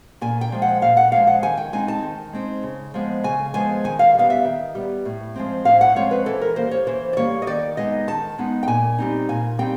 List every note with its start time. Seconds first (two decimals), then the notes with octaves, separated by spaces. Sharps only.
0.21 A#2 G#5
0.41 G5
0.52 F3 G#3
0.62 F#5
0.82 A#2 F5
0.97 F#5
1.12 F3 G#3 F5
1.27 F#5
1.43 D#3 G#5
1.57 G5
1.73 G#3 C4 D#4 G#5
1.88 A5
2.03 D#3
2.33 G#3 C4 D#4
2.63 C#3
2.94 F3 G#3 B3
3.24 C#3 G#5
3.54 F3 G#3 B3 G#5
3.84 D#3 G#5
3.99 F5
4.14 G3 B3 F5
4.30 E5
4.45 D#3
4.75 G3 B3
5.05 A2
5.35 F3 G#3 C4
5.65 A2 F5
5.81 F#5
5.96 F3 G#3 C4 C#5
6.11 B4
6.26 E3 A4
6.41 A#4
6.56 G3 A#3 C5
6.71 C#5
6.87 E3 C5
7.13 D5
7.17 G3 A#3 C#5
7.42 D#5
7.47 D#3 D5
7.77 G#3 B3 D#4 D#5
8.08 D#3 A5
8.38 G#3 B3 D#4
8.63 G5
8.68 A#2 G#5
8.98 G3 C4 D#4
9.29 A#2 G#5
9.58 G3 C4 D#4 G5